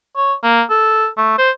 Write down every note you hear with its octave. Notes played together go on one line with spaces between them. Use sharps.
C#5
A#3
A4
A3
C5